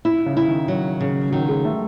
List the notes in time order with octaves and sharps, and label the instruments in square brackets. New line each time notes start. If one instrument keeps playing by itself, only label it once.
[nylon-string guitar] E4
[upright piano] C#3
[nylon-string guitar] E4
[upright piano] D#3
[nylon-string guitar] F#3
C#3
[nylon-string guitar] D#3 [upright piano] F#3
[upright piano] G#3
A3